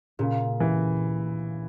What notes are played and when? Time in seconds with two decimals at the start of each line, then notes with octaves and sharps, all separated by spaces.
0.19 A#2 C#3
0.60 E3